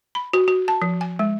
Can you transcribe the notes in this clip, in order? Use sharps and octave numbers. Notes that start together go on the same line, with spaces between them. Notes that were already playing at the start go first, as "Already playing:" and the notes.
B5
F#4
F#4
A5
F3
G#5
G#3